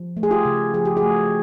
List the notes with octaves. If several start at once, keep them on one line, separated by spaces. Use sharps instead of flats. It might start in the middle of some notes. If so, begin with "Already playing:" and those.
Already playing: F3
A3
G#4
F4 G4
C#3
F3 G#4
G4
F#4 G#4
A3